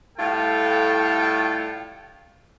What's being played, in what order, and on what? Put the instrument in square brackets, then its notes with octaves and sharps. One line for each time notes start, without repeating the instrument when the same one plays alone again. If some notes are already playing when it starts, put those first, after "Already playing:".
[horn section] A2 G3 A3 F4 A4 G5